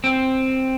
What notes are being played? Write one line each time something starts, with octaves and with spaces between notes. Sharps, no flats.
C4